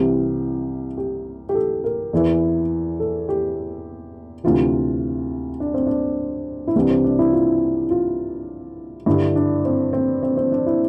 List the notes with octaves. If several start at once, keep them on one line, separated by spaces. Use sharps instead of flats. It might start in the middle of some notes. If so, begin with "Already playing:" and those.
Already playing: C2 C3 E3 G4
G4
G4
A4
A#4
E2 E3
A4
G4
D2 C3 E3 F4
D4
C4
D4
E4
C2 C3 E3 D4
C4
D4
E4
F4
F4
G2 D3 E4
D4
C4
C4
C4
C4
D4
E4